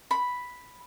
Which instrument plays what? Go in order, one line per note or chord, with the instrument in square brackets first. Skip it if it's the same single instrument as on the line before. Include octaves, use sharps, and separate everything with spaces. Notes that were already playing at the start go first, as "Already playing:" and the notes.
[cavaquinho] B5